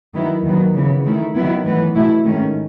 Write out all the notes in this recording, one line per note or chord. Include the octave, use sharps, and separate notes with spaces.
D#3 F#3 B3 E4
D#2 D#3 F#3 B3
C#3 E3 B3
D#3 A3 E4
D#3 F#3 B3 E4
A2 E3 B3
B2 A3 E4
G#2 D#3 A3 C#4